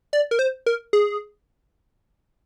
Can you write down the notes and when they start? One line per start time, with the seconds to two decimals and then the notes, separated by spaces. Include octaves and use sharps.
0.13 D5
0.31 A#4
0.39 C5
0.66 A#4
0.93 G#4